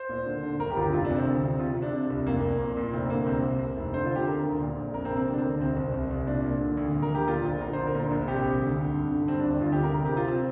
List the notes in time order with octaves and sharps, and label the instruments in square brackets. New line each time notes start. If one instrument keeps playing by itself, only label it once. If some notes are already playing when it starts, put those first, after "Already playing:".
Already playing: [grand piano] C5
A#2
D3
D3
G1 A#4
G4
G1 F4
G4
F1 F4
D4
C3
C4
D2 C4
C3
C3 F4
C3
D4
C3
C2
F1 A#3
F2
A#2
A#2
F1 C4
D3 A#3
C2 C4
C3
C3
F1
D3 C5
F4
D3
G4
D3 A#4
D2
A#2
A#1
F2 A#4
C4
C3
C4
D3 A#3
D4
C4
D2
C2 C4
C2
C2
C2
A#2 D4
A#2
D3
D2
D2
A#4
D2 G4
A#2 F4
A#1
D3 A#4
D3 C5
A#4
A#2
A#1
C3 G4
C2
D2
D3
G2
D3
G2 C4
D4
G1
D4
D2 F4
G4
D3
A#4
C3 A#4
G4
C3
F4
C4